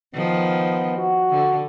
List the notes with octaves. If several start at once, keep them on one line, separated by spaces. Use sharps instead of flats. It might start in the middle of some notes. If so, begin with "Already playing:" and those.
D#3 F3 B3
F#4
D3